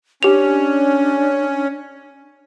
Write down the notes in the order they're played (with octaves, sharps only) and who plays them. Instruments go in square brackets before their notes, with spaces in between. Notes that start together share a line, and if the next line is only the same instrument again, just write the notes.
[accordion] C#4 [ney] D4 [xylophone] G4 F7